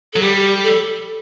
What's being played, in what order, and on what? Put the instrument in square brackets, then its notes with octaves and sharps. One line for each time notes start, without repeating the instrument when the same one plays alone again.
[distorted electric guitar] F#3 [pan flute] A4
[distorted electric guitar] G3 [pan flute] G4
[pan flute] G4
A4